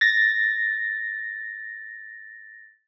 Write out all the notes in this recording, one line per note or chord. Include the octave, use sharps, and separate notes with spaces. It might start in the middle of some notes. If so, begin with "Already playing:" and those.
A6 A#6